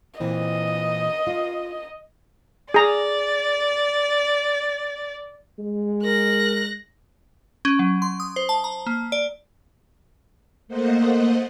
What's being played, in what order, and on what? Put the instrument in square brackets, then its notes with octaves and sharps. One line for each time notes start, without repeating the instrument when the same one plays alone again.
[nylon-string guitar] A#2 E3 C4 [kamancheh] D#5
[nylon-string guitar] F4
[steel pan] G#4 A#5 [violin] D5
[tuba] G#3
[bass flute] A#4 [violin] F#6 A#6
[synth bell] C#4
F#3
C6
D#6
C5
A5
A#5
A#3
D5
[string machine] A3 A#3 C5 D#5 F#5